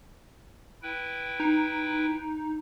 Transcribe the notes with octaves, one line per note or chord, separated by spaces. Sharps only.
E4 B4 G5
D#4